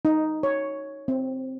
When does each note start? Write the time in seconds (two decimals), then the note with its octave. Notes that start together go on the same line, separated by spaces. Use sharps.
0.05 D#4
0.43 C#5
1.08 C4